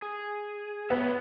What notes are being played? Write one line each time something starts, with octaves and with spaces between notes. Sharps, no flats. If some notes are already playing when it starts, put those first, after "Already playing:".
G#4
B3 B4 C#5 E5